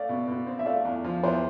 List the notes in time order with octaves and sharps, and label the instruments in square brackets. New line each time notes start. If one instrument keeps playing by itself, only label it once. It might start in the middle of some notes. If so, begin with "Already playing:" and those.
Already playing: [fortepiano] A3 [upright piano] D5 F5
[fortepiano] B2
B2
C4
[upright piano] E5
[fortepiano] A3 [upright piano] D5 F5
[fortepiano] E2
F3
[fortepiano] E2 [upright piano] C5 E5